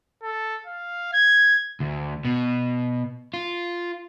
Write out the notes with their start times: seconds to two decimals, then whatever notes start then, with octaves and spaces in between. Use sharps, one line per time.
0.23 A4
0.67 F5
1.13 G#6
1.80 D2
2.25 B2
3.34 F4